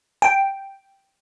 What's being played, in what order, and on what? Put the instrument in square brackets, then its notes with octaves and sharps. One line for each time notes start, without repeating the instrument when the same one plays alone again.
[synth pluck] G5